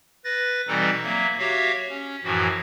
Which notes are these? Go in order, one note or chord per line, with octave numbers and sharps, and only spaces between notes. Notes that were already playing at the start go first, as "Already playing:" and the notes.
B4 A6 A#6
B2 E3 G3 C4 D#4 A4
F#3 A#3 E5
F#4 G4 C#5 E5 F5
C#4
F#2 A2 E3 F3 F#4